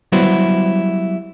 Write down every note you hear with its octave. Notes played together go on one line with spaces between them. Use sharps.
F#3 G3 B3 E4 F#4 C5